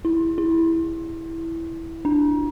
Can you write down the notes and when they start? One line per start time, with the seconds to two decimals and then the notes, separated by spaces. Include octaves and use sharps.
0.05 E4
0.38 E4
2.05 D4